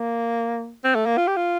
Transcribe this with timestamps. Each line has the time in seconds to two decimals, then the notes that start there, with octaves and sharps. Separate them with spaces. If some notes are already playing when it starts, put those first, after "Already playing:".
Already playing: A#3
0.84 C4
0.95 A3
1.06 A#3
1.17 F4
1.27 G4
1.36 F4